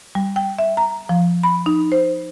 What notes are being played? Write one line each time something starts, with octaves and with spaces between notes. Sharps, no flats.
G3
G5
E5
A#5
F3
B5
D#4
C5